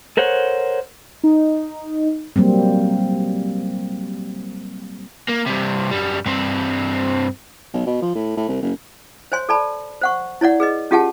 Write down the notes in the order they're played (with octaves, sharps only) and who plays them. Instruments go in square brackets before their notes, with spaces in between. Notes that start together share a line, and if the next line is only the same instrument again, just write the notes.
[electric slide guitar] A4 A#4 C5 C#5 F#5
[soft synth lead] D#4
[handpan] F#3 G3 A#3 C4
[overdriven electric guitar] A#3
G2 C3
F#2 G3
G2 C4
[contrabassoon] B1
B2
F3
A2
A2
C2
F#1
[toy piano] C5 C#5 G#5 C6
A4 D5 A5 B5
C5 F#5 C#6
E4 C#5 D5 F#5
G#4 B4 D#5
C#4 F4 G4 G#4 F#5 A5